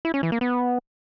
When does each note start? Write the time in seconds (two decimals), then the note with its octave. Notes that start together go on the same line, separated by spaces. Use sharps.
0.05 E4
0.14 C#4
0.23 E3
0.32 A#3
0.41 B3